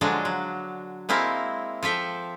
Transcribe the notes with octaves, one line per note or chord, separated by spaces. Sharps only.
D3 F3 F#3 G#3 D4
F#3
G#3 A#3 C4 E4 A#4
F3 A4 E5 G5